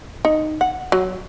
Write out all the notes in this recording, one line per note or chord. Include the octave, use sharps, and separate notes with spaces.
D#4
F#5
F#3